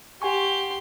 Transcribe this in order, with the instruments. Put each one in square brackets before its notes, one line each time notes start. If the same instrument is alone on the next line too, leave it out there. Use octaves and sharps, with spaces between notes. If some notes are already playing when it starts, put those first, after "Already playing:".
[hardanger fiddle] G4 C6 [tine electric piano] F#5 G#5 C#6